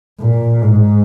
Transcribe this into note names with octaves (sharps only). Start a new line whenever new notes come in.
A#2
G#2